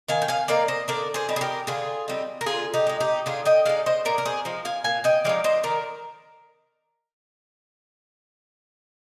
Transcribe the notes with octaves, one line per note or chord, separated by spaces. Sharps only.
D#3 F5 G#5
G5
F5 G#5
A#3 D#4 D5 F5
C5 D#5
D3 A#4 D5
G#4 C5
G3 C4 D#4
G#4
G4 A#4
D3 F4 G#4
G3 C4 D#4
A#4
D3 F4 G#4
D#4 G4
G#3 D#4
D#4 G4
D3 F4 G#4
D#5 G5
G#3 D#4 D5 F5
C5 D#5
A#2 A#4 D5
A#4
G#4 C5
F3 G#3 D#4
F5 G#5
A#2 F5 G#5
D#5 G5
F3 G#3 D#4 D5 F5
C5 D#5
D#3 A#4 D5